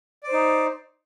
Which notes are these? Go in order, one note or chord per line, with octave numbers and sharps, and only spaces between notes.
D#4 C5 D5